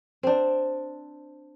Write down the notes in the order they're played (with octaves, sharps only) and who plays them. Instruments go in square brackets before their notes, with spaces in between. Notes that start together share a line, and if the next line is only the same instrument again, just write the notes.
[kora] C4 D4